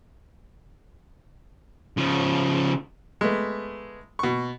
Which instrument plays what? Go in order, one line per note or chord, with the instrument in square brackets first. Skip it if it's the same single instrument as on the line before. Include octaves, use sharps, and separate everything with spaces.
[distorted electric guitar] C#3 F3
[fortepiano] G#3 A3 B3
B2 C#6